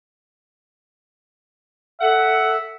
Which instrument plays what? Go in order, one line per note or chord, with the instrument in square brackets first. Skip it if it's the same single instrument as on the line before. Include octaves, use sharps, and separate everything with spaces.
[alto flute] A4 [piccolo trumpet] E5 [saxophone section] F#5